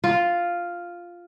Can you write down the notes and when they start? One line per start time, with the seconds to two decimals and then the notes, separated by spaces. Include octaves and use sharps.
0.04 F4